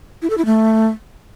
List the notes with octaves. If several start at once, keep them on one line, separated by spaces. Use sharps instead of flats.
E4
A4
E4
A3